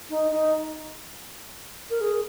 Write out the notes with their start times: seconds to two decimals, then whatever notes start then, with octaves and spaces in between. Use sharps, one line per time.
0.10 D#4
0.31 D#4
1.90 A#4
2.01 G#4